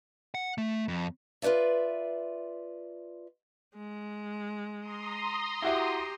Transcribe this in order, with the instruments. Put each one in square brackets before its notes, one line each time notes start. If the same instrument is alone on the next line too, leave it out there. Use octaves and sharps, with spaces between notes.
[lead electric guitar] F#5
A3
F2
[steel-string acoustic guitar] F4 B4 C5 D5 E5
[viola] G#3
[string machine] A#5 C6 D#6
[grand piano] E4 F#4 E5 [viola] G4